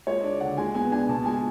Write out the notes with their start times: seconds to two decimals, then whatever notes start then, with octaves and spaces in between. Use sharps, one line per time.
0.07 G#3 C#5
0.23 D4 D5
0.41 D3 F#5
0.57 G#3 G#5
0.75 B3 G#5
0.91 D4 G#5
1.09 B2 A5
1.26 G#3 G#5